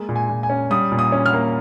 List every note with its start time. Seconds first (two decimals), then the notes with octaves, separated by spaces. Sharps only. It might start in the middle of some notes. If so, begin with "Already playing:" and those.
Already playing: G#3 A#3
0.09 A#2
0.16 G#5
0.29 A#2
0.43 G#5
0.50 C#4
0.70 G3 D#6
0.92 A#2
0.99 D#6
1.12 C#4
1.26 F6
1.33 A#3